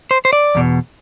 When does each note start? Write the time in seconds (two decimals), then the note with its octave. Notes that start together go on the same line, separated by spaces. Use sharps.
0.11 C5
0.25 C5
0.33 D5
0.55 E2 B2